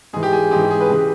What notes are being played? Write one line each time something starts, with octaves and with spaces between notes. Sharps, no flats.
G#2 E3 G#4
G4
G#4
G#2 E3 G4
G4
G#4
B4
C#3 E3 G#4
G4